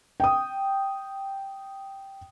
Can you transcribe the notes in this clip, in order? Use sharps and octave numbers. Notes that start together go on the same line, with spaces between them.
G5 D#6